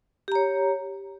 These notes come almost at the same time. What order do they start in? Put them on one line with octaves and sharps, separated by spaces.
G4 A#5 C#5